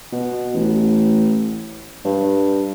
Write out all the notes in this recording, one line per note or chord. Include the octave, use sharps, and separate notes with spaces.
B2
A1
G2